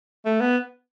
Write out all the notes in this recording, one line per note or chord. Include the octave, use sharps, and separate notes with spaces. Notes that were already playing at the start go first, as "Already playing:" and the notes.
A3
B3